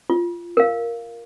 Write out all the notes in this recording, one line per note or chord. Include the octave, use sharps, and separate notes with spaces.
F4
A#4 F5